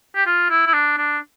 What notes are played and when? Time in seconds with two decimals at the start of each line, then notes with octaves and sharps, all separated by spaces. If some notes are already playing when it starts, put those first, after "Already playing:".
0.15 G4
0.26 F4
0.50 E4
0.67 E4
0.73 D4
0.98 D4